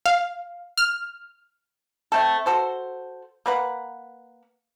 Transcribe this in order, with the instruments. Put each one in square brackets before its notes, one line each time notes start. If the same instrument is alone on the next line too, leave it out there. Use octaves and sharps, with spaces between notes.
[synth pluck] F5
F6
[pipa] A3 C4 A4
F#4 A4 C5
A#3 B4 F#5